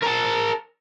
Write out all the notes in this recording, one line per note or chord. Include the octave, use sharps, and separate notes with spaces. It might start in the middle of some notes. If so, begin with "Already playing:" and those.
A#4 A5